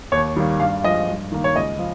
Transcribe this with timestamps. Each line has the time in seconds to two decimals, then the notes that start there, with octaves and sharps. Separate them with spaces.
0.12 D#2 C#5
0.36 D#3 G3 A#3
0.59 G2 F5
0.84 F3 G#3 D#5
1.08 G2
1.32 D#3 A#3
1.44 C#5
1.55 C#2 D#5
1.79 F3